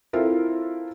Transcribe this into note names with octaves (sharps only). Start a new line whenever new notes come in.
C4 E4 F4 A4 A#4